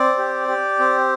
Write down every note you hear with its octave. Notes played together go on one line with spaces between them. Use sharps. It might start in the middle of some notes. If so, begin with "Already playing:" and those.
Already playing: C4 D5
G4
G4
C4